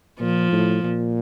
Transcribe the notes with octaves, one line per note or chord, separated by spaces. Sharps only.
A#2 F3
A2
A#2